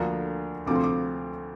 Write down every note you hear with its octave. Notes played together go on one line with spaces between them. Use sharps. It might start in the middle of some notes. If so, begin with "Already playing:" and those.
Already playing: D2 D3 F3 A#3 D4 A#5
D2 C3 F3 A3 C4 D6
C6
D6